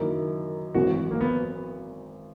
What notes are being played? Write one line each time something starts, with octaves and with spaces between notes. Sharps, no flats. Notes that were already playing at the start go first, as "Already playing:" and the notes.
Already playing: F#2 D#3 A#3 E4
G#1 F#2 E3 F#4
A#3
B3